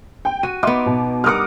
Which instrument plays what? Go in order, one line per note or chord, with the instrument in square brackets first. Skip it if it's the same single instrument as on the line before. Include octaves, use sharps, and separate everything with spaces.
[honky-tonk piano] G5
[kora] F#4 [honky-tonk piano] D#7
[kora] B3 D#4 [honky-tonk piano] E5 C6 D6
[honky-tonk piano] B2
[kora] G2 A#4 F#5 [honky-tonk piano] D6 D#6 F6